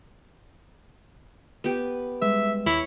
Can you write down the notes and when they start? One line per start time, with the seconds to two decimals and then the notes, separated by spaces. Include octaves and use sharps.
1.64 B3 G4
2.21 G3 G#3 B4 E5
2.66 D#2 E4 C#5